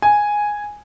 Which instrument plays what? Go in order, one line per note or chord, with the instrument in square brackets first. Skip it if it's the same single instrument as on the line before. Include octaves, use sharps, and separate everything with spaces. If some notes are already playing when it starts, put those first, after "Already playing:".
[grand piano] G#5